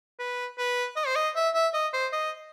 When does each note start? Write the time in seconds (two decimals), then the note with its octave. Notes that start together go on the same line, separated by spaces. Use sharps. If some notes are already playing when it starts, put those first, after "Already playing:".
0.19 B4
0.58 B4
0.96 D#5
1.06 C5
1.16 D#5
1.36 E5
1.55 E5
1.74 D#5
1.93 C5
2.13 D#5